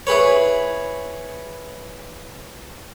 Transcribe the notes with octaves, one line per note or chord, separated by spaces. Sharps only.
E4 G#4 B4 C#5